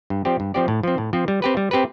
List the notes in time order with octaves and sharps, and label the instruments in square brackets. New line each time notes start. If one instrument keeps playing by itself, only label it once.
[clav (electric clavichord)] G2
F3 C4 G4 D5
G2
F3 C4 G4 D5
A2
F3 C4
A2
F3 C4
G3
C4 G4 B4
G3
C4 G4 B4